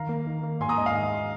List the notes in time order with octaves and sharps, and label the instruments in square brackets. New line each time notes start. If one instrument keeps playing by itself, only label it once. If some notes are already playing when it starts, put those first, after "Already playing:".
Already playing: [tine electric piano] D#3 [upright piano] F5 A#5
[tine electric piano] A#3
D#3
A#3
[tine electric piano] G#2 [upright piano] G#5 C6
[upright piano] A#5 D#6
[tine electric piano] G#2 [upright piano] D#5 G#5
[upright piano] F5
[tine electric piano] G#2
G#2